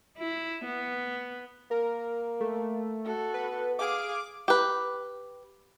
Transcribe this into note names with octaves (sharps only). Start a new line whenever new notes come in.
E4
B3
A#3 A#4
A3
F#4 A4
B3 B4
G#4 F5 D6
G4 B4